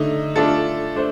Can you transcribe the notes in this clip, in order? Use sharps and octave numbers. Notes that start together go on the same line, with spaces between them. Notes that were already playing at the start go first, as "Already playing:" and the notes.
Already playing: D3 A3 D#4 D#5
A3 D4 F4 A4
A3 D4 C5